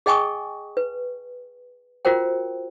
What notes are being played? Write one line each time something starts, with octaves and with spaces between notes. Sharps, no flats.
G#4 D#5 G5 G#5 C#6 D#6
B4
F4 F#4 A#4 C5 G5